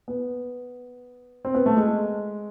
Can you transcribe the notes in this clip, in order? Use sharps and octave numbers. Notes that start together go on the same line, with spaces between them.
B3
C4
B3
A3
G#3